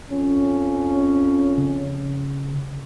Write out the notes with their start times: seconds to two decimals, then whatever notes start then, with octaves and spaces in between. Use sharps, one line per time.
0.10 F2 C#4
1.58 C#3